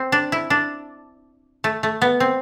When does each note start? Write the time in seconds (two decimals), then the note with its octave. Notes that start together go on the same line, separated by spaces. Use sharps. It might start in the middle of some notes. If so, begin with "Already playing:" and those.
Already playing: C4
0.12 D4
0.32 E4
0.50 D4
1.64 A3
1.83 A3
2.02 B3
2.20 C4